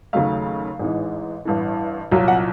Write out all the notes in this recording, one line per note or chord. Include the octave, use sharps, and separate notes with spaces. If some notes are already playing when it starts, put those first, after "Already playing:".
D#2 C#3 F#3 A3 F5
A1 G#2 E3 G#3
A1 G2 E3
C2 A#2 F#3
F#5